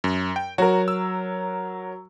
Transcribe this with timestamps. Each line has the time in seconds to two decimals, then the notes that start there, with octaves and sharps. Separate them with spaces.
0.04 F#2
0.36 G5
0.58 F#3 F#4 A#4
0.88 E6